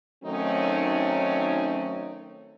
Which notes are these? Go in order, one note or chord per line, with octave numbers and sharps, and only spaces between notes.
D#3 F#3 A3 C4 C#4 D#4